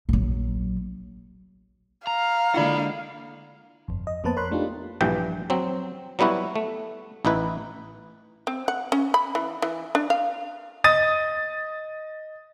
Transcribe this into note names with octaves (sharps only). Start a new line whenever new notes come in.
A#1 F#3
F5 A#5
D3 G#3 A#3 E4 F4 D5 F#5 B5
G1 F2
D#5
F2 A#3 B3 B4 C5 A5
A#4 C#5 B5 C6 F#6
A3 D4 D#4 F4 G4
A#1 G2 E3 G5
F#3 C4
F#3 G3 B3 E4 F#4
A3
A1 D#4 E4 B4
C4
F#5
C#4
B5
E3
E3
D4
F5
D#5 D#6 A6 D#7